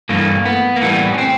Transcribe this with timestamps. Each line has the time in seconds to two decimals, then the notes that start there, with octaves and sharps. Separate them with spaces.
0.09 G2 E3 A3 A#3
0.46 B3
0.76 A#3
0.82 A2 E3 G3 B3
1.14 C#4
1.18 C4